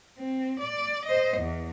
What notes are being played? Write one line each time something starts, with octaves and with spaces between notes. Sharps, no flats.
C4
D5
C5 D#5
E2